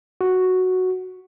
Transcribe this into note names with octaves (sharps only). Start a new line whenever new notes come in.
F#4